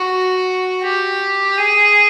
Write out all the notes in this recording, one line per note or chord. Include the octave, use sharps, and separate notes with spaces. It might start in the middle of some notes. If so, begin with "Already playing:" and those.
Already playing: F#4
G4
G#4